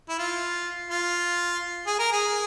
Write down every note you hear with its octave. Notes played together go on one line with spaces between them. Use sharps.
E4
F4
F4
G#4
A#4
G#4